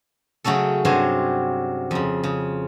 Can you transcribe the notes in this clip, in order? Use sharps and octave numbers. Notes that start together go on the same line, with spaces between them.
C#3 F#3 A3 C#4 A4
G2 C3 F#3 C#4 C5 G#5
F2 C#3
C#3